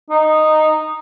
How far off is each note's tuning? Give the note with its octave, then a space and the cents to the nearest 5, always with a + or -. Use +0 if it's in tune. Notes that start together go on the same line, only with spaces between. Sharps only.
D#4 -5